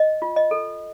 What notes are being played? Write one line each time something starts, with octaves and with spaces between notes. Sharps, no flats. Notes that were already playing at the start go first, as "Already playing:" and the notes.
Already playing: D#5
F4
D#5
A4